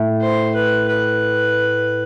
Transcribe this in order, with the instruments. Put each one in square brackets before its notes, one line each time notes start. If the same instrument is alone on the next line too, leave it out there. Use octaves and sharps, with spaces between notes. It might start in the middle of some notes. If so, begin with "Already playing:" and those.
Already playing: [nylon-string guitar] A2 A3
[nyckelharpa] C5
B4
B4